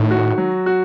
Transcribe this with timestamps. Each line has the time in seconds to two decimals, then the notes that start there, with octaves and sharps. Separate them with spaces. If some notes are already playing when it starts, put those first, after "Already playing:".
Already playing: A2 D#3
0.11 F#4
0.38 F#3
0.66 F#4